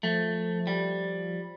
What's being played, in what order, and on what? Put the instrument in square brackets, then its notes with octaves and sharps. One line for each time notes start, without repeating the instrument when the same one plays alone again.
[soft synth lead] F3 [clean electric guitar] A3
[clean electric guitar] G3